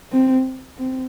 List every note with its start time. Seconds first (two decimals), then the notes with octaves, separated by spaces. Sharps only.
0.12 C4
0.78 C4